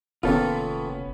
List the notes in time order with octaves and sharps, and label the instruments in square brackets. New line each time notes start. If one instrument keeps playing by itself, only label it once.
[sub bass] F1 [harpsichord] A#2 D#3 [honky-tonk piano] B3 C#4 [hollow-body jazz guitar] F4 A4